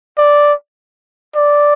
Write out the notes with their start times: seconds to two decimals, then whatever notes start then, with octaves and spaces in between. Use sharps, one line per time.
0.18 D5
1.35 D5